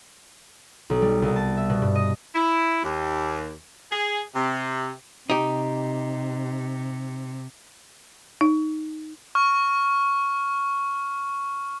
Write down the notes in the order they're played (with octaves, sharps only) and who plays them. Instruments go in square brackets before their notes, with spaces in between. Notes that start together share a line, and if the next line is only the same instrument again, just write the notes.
[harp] B1
G3
C2
A5
E5
B2
G2
D#5
[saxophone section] E4
D#2
G#4
C3
[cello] C3 [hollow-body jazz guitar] D#4 G4
[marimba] D#4
[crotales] C#6 F6